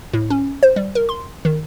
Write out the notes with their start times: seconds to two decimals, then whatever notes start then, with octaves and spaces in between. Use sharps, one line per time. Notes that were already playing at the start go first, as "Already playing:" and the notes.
0.13 A2
0.30 C#4
0.63 C5
0.76 G3
0.95 A#4
1.09 C6
1.45 D#3